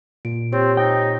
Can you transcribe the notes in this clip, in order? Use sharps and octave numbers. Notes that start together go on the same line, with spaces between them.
A#2 D7
C4 G4 C5 C#5
D#4 G5